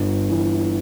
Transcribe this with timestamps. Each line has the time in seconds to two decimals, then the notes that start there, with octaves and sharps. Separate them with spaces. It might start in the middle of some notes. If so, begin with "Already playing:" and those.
Already playing: G1
0.29 E3